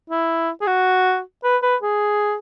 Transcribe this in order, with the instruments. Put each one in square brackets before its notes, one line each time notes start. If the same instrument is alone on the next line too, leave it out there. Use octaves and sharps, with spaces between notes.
[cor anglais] E4
G#4
F#4
B4
B4
G#4